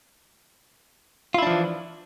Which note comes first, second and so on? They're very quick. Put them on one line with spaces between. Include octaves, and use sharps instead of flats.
F4 E4 D4 F3 E3